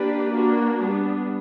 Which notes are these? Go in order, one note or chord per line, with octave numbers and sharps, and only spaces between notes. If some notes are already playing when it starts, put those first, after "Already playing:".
Already playing: A#3 D4 G4 B4 D5
A#3 D4 F#4
G3 B3 D4